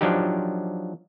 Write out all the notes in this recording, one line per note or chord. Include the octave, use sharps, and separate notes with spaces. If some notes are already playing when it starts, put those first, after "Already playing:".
F3 F#3 D4 D#4 G4